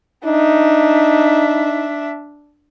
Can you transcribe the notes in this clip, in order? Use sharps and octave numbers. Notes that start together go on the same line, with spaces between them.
D4 D#4 E5